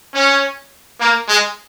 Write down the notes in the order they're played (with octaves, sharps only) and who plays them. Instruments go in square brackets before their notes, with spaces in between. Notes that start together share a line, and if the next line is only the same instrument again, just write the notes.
[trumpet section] C#4
A#3
G#3